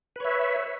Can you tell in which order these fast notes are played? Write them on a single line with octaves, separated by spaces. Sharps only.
B4 C#5 E5